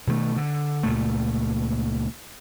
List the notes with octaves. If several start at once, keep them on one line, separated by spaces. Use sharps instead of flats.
B2 D#3 E3 A3
D3
C#2 A#2 A3